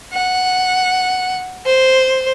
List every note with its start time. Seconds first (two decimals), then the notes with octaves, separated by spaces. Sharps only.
0.13 F#5
1.66 C5